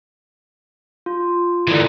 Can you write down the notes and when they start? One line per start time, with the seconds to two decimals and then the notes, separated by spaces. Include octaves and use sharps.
1.06 F4
1.68 D3 E3